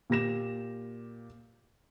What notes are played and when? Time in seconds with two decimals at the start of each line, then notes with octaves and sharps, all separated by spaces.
0.10 A#2 G4 A#6 E7